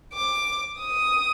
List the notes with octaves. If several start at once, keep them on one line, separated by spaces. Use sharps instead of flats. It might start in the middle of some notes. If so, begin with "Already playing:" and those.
D6
D#6